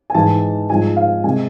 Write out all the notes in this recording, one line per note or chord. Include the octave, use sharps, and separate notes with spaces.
G#5
G#2 E3 G#3 A5
G#2 F3 G#3 G#5
F5
C3 G#3 G#5